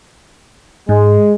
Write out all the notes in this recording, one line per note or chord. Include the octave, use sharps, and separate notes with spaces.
G#2 G#3